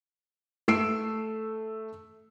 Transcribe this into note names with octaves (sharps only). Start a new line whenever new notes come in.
A3 E6 C7 D7